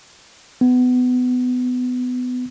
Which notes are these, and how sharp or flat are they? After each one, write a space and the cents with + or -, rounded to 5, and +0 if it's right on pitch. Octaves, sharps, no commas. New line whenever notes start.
B3 +20